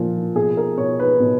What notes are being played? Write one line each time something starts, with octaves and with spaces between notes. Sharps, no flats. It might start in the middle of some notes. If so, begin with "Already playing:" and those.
Already playing: A#2 F3
B2 G#4
A#4
B2 C#5
B4
B2